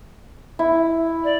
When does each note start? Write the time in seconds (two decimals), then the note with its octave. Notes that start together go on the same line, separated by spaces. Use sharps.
0.59 E4
1.23 D5